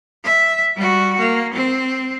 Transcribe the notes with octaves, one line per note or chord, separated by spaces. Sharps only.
E5
G3 F#4
A#3
C4